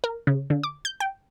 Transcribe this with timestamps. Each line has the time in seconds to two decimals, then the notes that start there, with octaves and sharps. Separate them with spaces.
0.04 A#4
0.27 C#3
0.50 D3
0.63 D6
0.85 G6
1.00 G5